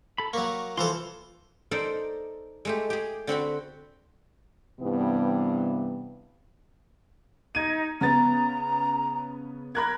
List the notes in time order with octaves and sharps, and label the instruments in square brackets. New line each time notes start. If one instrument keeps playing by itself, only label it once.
[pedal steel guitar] A4 B5
[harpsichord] F#3 A#3 [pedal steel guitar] C#6
[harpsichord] E3 F3 A4 [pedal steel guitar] F4 C6
[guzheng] D#4 A4 A#4 C5 D5
G#3 A3 G4
G4 G#4
D3 C4 F#4 B5
[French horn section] G2 C3 E3 B3
[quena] D#4 [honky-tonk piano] G#6 D#7
[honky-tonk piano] C#3 B3 A6 [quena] A#5
[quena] A#4 [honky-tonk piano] B5 F#6 G#6